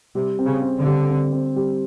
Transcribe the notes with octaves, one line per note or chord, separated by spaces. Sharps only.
C3 G3
C4
C#3
C4
D3
G3
C4
C4
G3